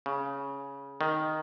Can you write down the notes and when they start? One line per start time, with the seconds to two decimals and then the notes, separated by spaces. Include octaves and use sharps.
0.06 C#3
1.01 D#3